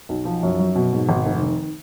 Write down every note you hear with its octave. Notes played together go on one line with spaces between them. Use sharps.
B1
F3
F#2
F#3
B2
G#2
G#1
F1
D#3